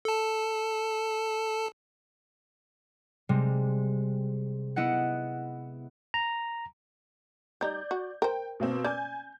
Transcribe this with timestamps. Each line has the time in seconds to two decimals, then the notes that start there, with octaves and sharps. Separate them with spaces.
0.05 A4 A5
3.29 C3 G3 G#3
4.76 B3 E4 D#5 F#5
6.14 A#5
7.61 G3 D#4 D5 G6
7.91 F#4
8.22 A#4 C5 G5
8.60 B2 A#3 C4
8.84 C#4 D5 G#5 G6